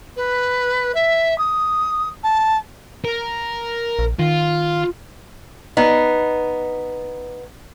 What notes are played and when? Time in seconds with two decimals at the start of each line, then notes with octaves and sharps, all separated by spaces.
0.16 B4
0.94 E5
1.38 D#6
2.23 A5
3.05 A#4
3.99 A#1
4.19 D#3 F4
5.77 B3 D#4